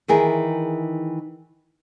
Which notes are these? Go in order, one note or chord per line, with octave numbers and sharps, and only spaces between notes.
D#3 E3 G#4 A#4